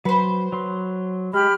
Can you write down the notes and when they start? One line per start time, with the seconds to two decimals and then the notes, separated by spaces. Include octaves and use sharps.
0.05 F#3 B4 C5
0.52 F#3 C6
1.33 G#3 G4 B5 F6